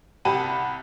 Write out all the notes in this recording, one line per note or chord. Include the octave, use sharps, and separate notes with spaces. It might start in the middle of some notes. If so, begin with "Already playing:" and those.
C2 G4 F#5 A5 B5 D#7